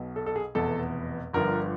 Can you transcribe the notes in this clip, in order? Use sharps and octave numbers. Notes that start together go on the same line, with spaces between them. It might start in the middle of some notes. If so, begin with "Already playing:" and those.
Already playing: B1 B2
A4
A4
G#4
F1 E2 B2 A4
G1 G2 D3 F3 A#4